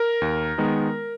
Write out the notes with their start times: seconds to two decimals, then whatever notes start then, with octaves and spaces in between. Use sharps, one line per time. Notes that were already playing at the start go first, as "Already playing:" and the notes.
Already playing: A#4
0.22 D#2
0.58 D#3 G#3 B3 D#4